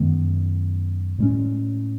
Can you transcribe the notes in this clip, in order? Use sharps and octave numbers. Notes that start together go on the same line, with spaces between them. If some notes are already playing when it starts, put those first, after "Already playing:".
Already playing: F#2 D#3 G#3 B3
A2 G#3 C#4